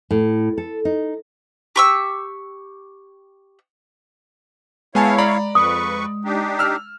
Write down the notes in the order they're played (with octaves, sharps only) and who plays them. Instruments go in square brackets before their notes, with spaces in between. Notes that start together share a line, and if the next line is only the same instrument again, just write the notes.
[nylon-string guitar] A2
A4
D#4
[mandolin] G4 C#6 E6
[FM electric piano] G#3 [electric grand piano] B3 G#5 A5 [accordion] E4 C#5 F5
[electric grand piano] D5 A#5 B5
[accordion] F2 B4 C#6 [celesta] D#6
[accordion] D4 D#4 G4
[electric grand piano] E6 F6